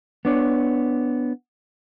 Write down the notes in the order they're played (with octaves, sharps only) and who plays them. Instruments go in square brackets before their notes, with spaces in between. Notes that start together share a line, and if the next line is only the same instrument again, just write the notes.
[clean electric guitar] B3 D4 C#5